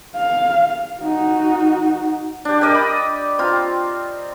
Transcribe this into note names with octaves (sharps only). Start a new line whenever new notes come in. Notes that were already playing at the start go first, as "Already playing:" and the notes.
F5
D#4 F#4
D4 G4
G4 A#4 D5 D#5
B5
C4 F4 A#5